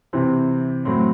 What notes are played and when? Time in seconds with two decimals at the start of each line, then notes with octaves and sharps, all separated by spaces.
0.13 C3 E3 C4
0.85 A2 F#3 C4